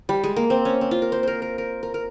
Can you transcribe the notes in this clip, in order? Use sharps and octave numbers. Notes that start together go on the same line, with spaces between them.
G3
G#3
A#3
C4
C#4
C4
F4
A#4
C5
A#4 C5
A#4
A#4
A#4
A#4